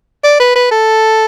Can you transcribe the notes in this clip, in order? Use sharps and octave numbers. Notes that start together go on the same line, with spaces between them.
D5
B4
B4
A4